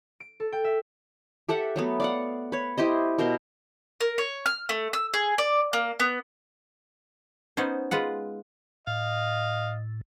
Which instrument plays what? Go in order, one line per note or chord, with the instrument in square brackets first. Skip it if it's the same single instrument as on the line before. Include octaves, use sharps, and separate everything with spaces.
[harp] D7
A4
G5
E5
[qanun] G4 A4 E5 F#5
F#3 A3 B3
D5 F5 F#5
B4 C#5
E4 G4 C5 D#5
B2 A#4 C5 C6
[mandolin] A#4
C#5
F6
A3
E6
G#4
D5
A#3
B3
[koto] B3 C#4 D#4 C5
G#3 F4 B4 F#5
[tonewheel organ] A2 [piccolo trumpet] D#5 [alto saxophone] F5